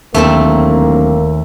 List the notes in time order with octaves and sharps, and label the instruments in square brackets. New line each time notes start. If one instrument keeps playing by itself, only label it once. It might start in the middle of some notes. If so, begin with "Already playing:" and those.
[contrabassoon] D1 [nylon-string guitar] D#2 [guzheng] A3 C4 A5 [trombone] A#3